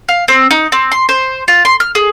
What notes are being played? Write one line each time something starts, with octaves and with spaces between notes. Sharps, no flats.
F5
C4
D#4
C4
C6
C5
F4
C6
F6
G#4